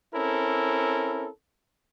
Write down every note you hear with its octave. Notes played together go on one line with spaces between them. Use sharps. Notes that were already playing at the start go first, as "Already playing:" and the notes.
C4 C#4 E4 A4 A#4